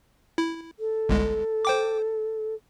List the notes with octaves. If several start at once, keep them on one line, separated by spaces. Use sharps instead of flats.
E4
A4
G1 C2 G#3
C5 G5 D6